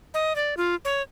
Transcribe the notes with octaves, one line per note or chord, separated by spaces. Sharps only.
D#5
D5
F4
C#5